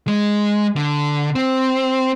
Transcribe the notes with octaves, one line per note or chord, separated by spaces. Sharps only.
G#3
D3
C4